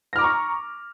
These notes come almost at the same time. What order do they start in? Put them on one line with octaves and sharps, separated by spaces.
A#6 F6 D6 A#5 C#6